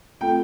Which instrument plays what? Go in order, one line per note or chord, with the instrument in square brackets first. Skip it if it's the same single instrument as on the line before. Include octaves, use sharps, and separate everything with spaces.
[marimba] A3 C4 F4 A4 [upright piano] G5